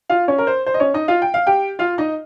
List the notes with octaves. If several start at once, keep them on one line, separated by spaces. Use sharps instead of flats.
F4 F5
C#4 C#5
A#4
C5
C5
D#5
C#4 C#5
D#4 D#5
F4 F5
G5
F5
G4 G5
F4 F5
D#4 D#5